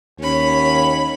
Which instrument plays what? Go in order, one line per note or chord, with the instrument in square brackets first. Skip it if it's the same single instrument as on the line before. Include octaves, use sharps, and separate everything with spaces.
[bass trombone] D#2 [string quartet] C#4 B5